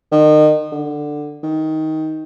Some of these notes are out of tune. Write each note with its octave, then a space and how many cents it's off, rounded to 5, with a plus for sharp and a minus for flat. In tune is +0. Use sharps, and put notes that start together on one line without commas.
D#3 -30
D3 +10
D#3 +15